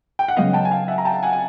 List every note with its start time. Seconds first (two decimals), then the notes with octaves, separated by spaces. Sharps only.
0.19 G5
0.28 F#5
0.36 C#3 F#3 B3 D#5 F5
0.53 G5 A5
0.65 G#5
0.71 F5 G5
0.88 E5 F#5
0.98 A#5
1.05 G5 A5
1.23 F#5 G#5
1.33 G#5